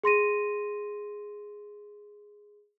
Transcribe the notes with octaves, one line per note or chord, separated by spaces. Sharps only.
G#4 C6 A#6 D#7